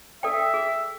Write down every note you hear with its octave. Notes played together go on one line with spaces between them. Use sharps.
A4 D5 E5 G5
G#4